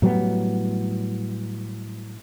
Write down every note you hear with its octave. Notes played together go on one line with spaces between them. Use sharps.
A2 F#3 G3 B3